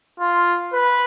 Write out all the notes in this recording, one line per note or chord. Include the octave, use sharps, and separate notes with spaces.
F4
B4